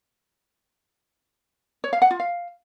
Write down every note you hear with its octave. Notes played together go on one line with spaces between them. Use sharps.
C#5
F5
F#5
F4
F5